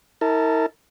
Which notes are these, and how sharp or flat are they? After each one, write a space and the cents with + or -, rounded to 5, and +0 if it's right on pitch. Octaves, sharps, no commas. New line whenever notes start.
E4 -40 A#4 -30 A5 -10